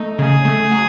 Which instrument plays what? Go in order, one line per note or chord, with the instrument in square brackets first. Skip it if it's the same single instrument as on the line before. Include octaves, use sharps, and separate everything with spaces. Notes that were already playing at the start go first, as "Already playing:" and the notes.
Already playing: [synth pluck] A3 [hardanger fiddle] D#4
[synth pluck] C#3 [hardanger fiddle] G#4
[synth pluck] A3
F#3